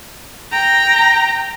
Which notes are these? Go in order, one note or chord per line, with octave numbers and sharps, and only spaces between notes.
G5 A#5